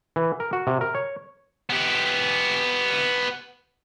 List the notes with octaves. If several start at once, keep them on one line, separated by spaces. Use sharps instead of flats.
E3
A#4
F#4
C3
A#4
C#5
B3 G4